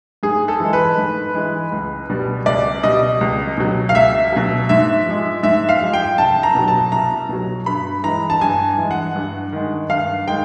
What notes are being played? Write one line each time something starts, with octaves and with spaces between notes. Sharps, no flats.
G#2 G#4
A4
E3 G#3
B4
G#2
E3 G#3
C#2
B2 G3
C#2 D5
B2 G3 D#5
C#2
B2 F#3
F5
C#2 E5
B2 F#3
G#2 E5
F3 G#3
G#2 E5
F5
F3 G#3
G5
C2 A5
A#5
B2 F#3
A5
C2 A#5
B2 F#3
G2 B5
E3 G#3 A#5
A5
G2 G#5
E3 G#3
F#5
G2
D#3 G#3
G2 F5
D#3 G#3 G5